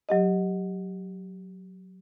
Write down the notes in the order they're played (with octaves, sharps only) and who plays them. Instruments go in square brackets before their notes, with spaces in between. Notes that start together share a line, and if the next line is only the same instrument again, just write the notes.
[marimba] F#3 G4 D#5